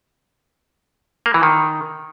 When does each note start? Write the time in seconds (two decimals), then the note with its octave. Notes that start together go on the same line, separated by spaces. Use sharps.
1.26 A#3
1.34 E3
1.43 D#3